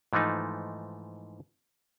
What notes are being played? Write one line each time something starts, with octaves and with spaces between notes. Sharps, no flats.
G#2 E3 F3 A3 D#4